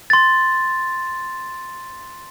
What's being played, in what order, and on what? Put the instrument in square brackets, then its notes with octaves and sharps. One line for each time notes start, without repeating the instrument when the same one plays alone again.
[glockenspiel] C6 A6